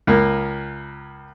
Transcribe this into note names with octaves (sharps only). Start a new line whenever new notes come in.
C#2 A#3